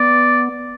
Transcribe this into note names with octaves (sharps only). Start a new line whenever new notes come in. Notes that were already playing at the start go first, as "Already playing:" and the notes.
Already playing: B3 D5